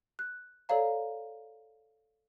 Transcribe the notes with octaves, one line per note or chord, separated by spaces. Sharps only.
F#6
A4 C#5 D5 F5 A#5